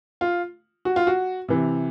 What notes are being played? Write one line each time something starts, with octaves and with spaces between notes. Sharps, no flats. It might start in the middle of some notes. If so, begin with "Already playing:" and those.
F4
F#4
F4
F#4
C3 E3